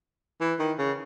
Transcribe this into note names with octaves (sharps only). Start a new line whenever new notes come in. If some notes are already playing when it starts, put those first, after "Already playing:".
E3
D#3
C#3